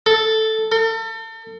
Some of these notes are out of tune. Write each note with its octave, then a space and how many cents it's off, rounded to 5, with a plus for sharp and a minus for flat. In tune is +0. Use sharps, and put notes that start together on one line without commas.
A4 +0
A4 +40